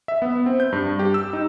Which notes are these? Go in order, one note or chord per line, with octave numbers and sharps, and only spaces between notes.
E5
B3
C4
G6
G2
G4
E6
D#4